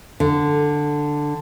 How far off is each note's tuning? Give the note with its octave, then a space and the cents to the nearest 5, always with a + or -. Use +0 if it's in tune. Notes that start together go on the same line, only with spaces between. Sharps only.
D3 +5